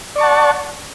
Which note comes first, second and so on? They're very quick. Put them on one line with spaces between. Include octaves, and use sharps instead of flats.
D5 C#6 A5 F#5